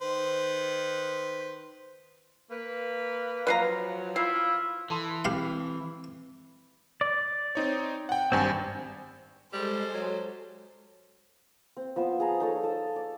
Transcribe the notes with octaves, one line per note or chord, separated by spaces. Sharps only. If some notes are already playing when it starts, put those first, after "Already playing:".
D#3 B4 C5
A#3 B4
F3 F#3 B4 F5 A#5
E4 F4 F5
E3 A4 A5 C6
C4 G4 B4 F5 B5
D5
C4 D#4 C#5
F#5 G5
G#1 G2 C4 G#5
G3 G#3 A4 C5
F#3
C4
F3 B3 E6
G#4 A5 A#5
D#4 A4 C#5
A4 D#6 E6
D5